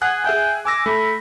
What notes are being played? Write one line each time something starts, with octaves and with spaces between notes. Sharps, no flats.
G#4 F#5 G#5 F#6
G#4 E5 G5 G#5
G#5 D6 E6 A#6
A3 B5